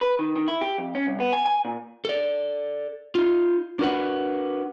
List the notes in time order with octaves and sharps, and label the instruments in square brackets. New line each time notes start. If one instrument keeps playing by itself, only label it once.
[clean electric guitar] B4
D#3
D#3
E4
G4
F2
C#4
C2
B3
G#5
G#5
A#2
[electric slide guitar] A4 D5
D#4 F4
D4 F#4 A#4 B4 F#5